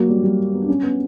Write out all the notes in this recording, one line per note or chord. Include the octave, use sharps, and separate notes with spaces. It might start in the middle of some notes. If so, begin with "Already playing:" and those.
Already playing: F#3 A#3
G3
G3
B3
D4
C#4
B3